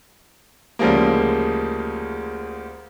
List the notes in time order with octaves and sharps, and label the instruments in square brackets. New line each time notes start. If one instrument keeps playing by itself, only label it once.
[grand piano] D2 C#3 F3 G3 G#3 A#3